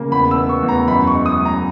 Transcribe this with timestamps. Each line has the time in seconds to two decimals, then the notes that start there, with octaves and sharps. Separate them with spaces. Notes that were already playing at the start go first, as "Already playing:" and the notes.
Already playing: C#3 A#3
0.11 E2 B5
0.31 E6
0.36 B3
0.49 C#6
0.62 E2
0.68 A#5
0.88 F#2 B5
1.07 C#6
1.13 G#3
1.26 D#6
1.39 F#2
1.45 A#5